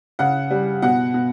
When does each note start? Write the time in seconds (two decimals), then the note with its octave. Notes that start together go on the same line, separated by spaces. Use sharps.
0.19 C#3 F#5
0.50 G3
0.82 B2 F#5
1.14 B2